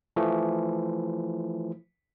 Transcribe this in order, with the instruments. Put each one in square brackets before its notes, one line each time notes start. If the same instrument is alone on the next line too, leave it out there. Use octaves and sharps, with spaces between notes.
[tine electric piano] E3 F3 A3